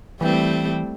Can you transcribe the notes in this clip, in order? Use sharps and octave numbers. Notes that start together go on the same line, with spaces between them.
E3 G3 A3 C4 E4